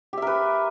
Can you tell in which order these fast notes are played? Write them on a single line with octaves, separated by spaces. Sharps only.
G4 E5 A#4 B4